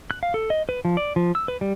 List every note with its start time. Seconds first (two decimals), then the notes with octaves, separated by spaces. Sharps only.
0.11 F#6
0.23 F5
0.34 A4
0.50 D#5
0.69 B4
0.85 F3
0.97 D5
1.16 F3
1.35 E6
1.48 B4
1.61 G3